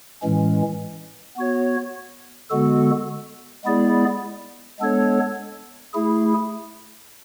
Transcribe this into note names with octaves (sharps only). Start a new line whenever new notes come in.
A2 E3 G#3 C#4
B3 F#4 C#5
D3 G#3 B3 F#4 A4
G#3 B3 E4 G#4 D5
G#3 B3 D4 A4 C#5
A3 E4 G#4